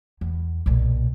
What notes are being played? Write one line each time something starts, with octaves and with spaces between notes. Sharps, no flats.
E2
B1 A#2